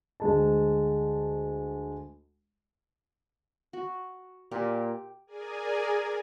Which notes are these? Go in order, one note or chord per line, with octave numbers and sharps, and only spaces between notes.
D2 G#3 A5
F#4
A#2 G4
G#4 A#4 D5 G#5